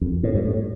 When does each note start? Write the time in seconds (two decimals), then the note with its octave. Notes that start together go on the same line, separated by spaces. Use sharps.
0.01 F2
0.23 A2
0.35 G2
0.45 A2